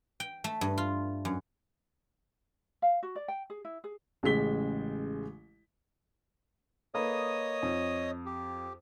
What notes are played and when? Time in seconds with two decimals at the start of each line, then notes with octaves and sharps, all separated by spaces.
0.20 G5
0.44 A3
0.61 G2
0.78 F4
1.25 F#2
2.82 F5
3.03 F#4
3.15 D5
3.28 G5
3.50 G#4
3.65 E4
3.84 G#4
4.23 A1 C#3 G#3 B6 G7
6.95 A#3 A4 B4 C#5 D#5 D#6
7.63 F2
8.26 G4